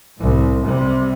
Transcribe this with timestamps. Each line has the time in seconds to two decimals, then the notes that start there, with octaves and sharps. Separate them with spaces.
0.18 C2 A2
0.65 C3 G3